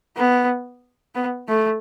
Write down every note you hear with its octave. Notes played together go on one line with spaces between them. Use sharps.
B3
B3
A3